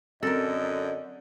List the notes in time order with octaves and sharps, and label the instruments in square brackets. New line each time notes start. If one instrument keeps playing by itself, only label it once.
[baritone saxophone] F#2 [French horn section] D3 D#5 [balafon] C4 [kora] A4 A#4